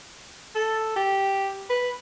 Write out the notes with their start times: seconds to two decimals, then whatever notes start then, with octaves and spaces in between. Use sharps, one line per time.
0.55 A4
0.96 G4
1.70 B4